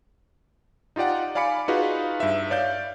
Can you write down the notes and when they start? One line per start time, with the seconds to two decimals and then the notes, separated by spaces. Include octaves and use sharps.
0.96 D#4 F4 G4 D5 F#5
1.35 D5 F5 G#5 B5 D6 C#7
1.68 D#4 F4 F#4 G#4 B4 F5
2.20 G2 E5
2.50 C#5 D5 F5 G6